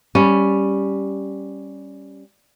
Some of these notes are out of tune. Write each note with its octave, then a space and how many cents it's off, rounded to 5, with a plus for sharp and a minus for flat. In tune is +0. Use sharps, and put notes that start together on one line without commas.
G3 +0 C#4 +0